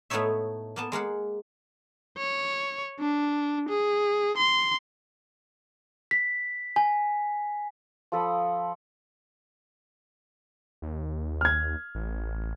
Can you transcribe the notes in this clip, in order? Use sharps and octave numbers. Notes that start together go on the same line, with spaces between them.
A2 A3 B3 D#4 C#5 E5
A#3 B3 A5
G#3 A#3 F5 F#5
C#5
D4
G#4
C6
B6
G#5
F3 A4 B5 D#6
D#2
F6 G#6
A1